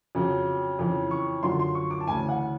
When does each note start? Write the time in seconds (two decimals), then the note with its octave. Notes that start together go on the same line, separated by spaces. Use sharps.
0.15 F2 C#3 F#3
0.79 F2 C#3 E3
1.11 C#6
1.43 F#2 D3 F3 C6
1.59 C6
1.75 C#6
1.91 D6
2.00 A5
2.07 D2 C#3 E3 G#5
2.29 F#5